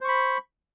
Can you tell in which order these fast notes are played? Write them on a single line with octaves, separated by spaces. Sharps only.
C5 C#6 B5